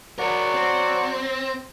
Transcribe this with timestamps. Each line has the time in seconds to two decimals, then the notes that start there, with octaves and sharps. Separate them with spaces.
0.18 F#3 G#4 A#4 D5 F#5
0.54 C4